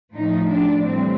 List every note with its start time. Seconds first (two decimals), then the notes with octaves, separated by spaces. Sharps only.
0.13 A2 F3 D#4
0.50 D4
0.85 A2 E3 G3 C4